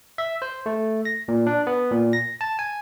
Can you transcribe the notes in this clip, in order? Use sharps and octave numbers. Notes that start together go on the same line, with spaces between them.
E5
C5
A3
A#6
A#2
D4
B3
A#2
A#6
A5
G#5